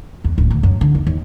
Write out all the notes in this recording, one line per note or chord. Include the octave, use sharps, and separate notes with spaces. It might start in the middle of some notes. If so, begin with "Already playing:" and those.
E2
D1
D2
F#2
D3
D#2
D#2